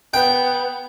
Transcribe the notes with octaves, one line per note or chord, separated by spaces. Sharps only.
B3 G5